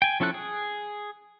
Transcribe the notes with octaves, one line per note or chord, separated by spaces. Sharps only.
G5 G#5
F3 C#4 E4 A4 F#6
G#4